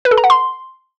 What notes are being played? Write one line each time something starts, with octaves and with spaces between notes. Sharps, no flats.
B4
A4
A#5
F#5
C6